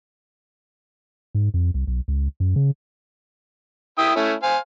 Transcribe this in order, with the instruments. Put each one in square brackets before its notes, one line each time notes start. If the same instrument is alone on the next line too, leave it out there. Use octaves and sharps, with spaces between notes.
[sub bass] G#2
F2
C2
B1
C#2
F#2
C#3
[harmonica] E4 G5 D#6
A3 C#4 E4
C5 F5 G#5